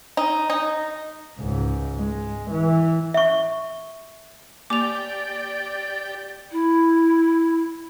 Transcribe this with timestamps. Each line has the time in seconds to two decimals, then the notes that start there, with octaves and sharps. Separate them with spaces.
0.17 D#4
0.50 D#4
1.38 C#2 G#2
1.97 G#3
2.51 E3
3.14 E5 C#6
4.70 A#3 G4 D5 D6 F7
6.51 E4